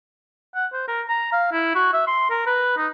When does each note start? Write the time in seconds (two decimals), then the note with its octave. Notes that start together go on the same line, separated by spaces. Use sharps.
0.55 F#5
0.73 C5
0.88 A#4
1.08 A#5
1.33 F5
1.52 E4
1.75 F#4
1.94 E5
2.08 C6
2.30 A#4
2.47 B4
2.77 D#4